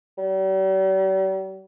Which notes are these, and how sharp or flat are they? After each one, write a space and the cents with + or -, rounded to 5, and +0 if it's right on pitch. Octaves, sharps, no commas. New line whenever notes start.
G3 -45